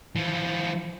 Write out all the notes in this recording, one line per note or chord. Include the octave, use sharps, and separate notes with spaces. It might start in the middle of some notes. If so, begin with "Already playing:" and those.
E3 F3